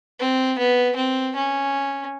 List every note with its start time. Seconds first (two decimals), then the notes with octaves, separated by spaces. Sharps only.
0.20 C4
0.59 B3
0.96 C4
1.36 C#4